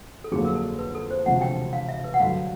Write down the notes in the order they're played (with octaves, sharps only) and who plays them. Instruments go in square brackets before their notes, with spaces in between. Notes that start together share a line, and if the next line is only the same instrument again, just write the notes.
[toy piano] A4
[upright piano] G1 F2 D3 F#3 A#3 [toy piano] G#4
[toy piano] A#4
A4
B4
A4
C5
[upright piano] E1 D2 C3 F3 [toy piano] F#5
[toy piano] G5
F5
E5
B4
F#5
[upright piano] G2 D3 F#3 [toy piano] F5